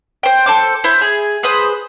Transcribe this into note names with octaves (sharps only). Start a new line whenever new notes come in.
C5 G5
A4 C5 D6
E4 C5
G#4
G#4 B4 C5 D#6